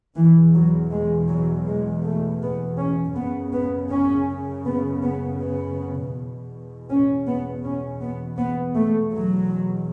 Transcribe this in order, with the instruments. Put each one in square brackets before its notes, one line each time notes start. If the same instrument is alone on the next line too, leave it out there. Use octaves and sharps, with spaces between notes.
[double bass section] E2 B2 E3
F#3
G#3
F#3
G#3
A3
B3
C#4
F#2 C#3 B3
B3
C#4
B3
B3
B3
E2 B2
C#4
B3
C#4
B3
B3
A3
E2 B2 F#3